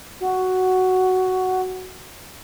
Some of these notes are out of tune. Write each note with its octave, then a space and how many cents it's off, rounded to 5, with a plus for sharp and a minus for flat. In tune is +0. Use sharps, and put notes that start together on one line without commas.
F#4 +5